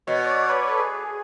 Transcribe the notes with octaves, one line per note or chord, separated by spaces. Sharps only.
B2 C#5
D5
D5
B4
C#5
A4
G#4